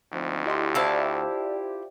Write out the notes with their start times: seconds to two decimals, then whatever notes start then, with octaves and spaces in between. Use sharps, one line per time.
0.13 D2 F3 C4 D#4
0.46 E4 F4 G4 D#5 C6
0.75 E4 C5 D5 E5 F5 A5